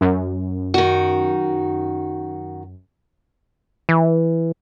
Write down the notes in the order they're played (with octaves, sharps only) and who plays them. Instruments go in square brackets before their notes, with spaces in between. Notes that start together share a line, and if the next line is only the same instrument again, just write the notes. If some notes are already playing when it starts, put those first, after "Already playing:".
[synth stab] F#2
[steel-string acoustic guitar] D#3 F#4
[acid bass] E3